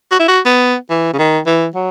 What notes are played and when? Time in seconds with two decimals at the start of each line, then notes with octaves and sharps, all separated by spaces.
0.11 F#4
0.19 E4
0.28 F#4
0.45 B3
0.90 E3
1.13 C#3
1.19 D#3
1.47 E3
1.75 F#3